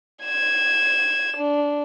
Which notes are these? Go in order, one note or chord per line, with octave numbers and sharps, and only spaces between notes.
G#6 E7
D4